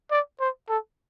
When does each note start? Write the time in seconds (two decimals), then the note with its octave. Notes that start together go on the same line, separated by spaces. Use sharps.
0.11 D5
0.40 C5
0.69 A4